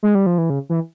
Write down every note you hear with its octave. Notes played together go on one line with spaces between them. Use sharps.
G#3
G3
F3
E3
C#3
E3